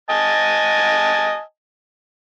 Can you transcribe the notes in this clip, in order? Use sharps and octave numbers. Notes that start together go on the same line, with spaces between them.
D#5 G#5 A5